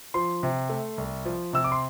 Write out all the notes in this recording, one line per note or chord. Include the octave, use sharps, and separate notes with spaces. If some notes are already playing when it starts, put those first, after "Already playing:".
F3 C6
C3
A3
C2
F3
C3 E6
D6
C6